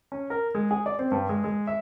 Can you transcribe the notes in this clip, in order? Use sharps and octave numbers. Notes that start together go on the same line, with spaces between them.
C#4
A#4
G#3
G#4
D5
C4
G2
G#3
G#3
E5